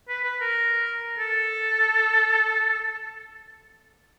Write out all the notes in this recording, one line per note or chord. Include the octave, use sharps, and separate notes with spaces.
B4
B4
A#4
A4